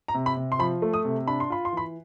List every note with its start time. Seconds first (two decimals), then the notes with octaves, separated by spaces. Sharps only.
0.08 A#5
0.14 C3
0.26 B5
0.37 C3
0.52 C6
0.59 F3 B5
0.82 A3
0.94 D#6
1.05 C3
1.27 D4 B5
1.40 C6
1.50 F4 B5
1.65 C6
1.72 E3 B5